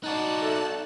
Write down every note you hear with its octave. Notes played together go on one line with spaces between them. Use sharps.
D#4 F#4 D5 A5 F#6
A4 E5